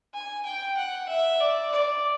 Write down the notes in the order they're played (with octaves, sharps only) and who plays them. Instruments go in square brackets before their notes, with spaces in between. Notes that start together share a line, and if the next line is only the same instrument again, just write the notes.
[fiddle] G#5
G5
F#5
E5
D5
D5